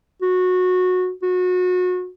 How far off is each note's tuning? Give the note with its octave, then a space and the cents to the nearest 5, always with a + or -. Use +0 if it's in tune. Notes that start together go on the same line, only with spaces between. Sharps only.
F#4 -15
F#4 -30